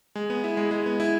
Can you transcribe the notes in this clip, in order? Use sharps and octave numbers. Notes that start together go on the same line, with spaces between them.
G#3
B3
E4
G#3
G#3
B3
E4